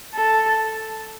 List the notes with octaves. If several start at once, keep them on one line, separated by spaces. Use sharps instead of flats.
A4